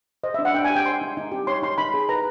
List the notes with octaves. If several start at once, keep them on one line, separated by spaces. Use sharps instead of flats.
C5 D#5
E5
D4
F#5
D4 G5
G#5
G4
G5
C5 C6
D#4
D#4
G4
C#5 C6
D#4 C6
D#4 B5
G#4
B4 A#5